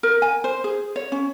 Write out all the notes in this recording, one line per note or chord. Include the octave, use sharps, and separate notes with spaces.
A#4
G#5
C5
G#4
C#5
C#4